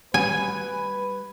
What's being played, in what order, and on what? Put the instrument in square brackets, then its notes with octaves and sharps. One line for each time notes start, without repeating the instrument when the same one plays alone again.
[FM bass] G3 [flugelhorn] B4 [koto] G#5